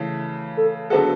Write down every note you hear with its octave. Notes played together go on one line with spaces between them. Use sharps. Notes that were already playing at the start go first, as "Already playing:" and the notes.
Already playing: C#3 E3 A3
A4
D3 F#3 B3 F#4 G#4 A4